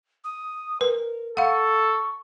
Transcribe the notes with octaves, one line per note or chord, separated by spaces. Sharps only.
D#6
A#4 B4
A4 F5 F#5 C#6